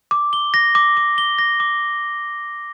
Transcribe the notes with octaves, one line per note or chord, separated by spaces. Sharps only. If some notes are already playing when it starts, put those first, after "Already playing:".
D6
G7
A#6
D6
D6
G7
A#6
D6